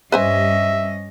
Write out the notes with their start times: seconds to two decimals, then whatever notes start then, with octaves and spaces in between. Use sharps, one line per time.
0.12 G2 G3 C#4 B4 C5 D#5 E5 G#5